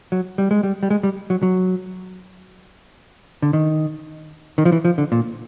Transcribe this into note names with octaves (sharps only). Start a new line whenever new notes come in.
F#3
G3
G#3
G3
G3
G#3
G3
F#3
F#3
D3
D#3
D#3
F3
E3
F3
D3
A#2